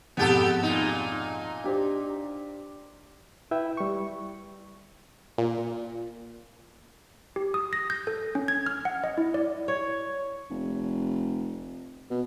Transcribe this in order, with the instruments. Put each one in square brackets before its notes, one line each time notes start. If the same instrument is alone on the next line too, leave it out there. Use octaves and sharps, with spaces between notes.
[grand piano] F2 G#2 B2 [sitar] B3 G4 A4
[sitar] A#2 D#4
[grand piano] D4 G4 C5
[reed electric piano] E4 B4 E5 G5
G3 C#6
[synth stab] A#2
[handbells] G4
D#6
A#6
G6
A4
C#4
G#6
F6
F#5
D#5
E4
D5
[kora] C#5
[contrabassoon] F1
B2